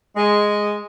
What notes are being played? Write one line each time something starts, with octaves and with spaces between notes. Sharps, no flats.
G#3